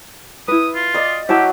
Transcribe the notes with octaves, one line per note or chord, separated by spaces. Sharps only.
E4 B4 D#6
F4
D5 D#5
F#3 E4 G4 A5